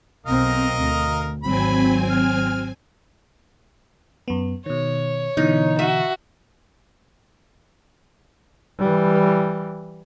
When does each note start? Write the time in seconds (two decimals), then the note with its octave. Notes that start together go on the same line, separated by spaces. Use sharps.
0.26 B1 B2 C4 A#4 D#5 F5
0.77 D2
1.43 G#1 F#3 C4 G#5 B5
2.10 F6
4.28 F#2 B3
4.66 B2 D#3 C#5
5.37 B2 D3 E3 D#4
5.79 F#4 E5
8.79 E3 G3